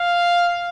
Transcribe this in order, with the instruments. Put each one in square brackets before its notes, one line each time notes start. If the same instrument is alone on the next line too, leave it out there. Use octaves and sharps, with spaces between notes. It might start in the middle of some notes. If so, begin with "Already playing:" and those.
Already playing: [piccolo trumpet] F5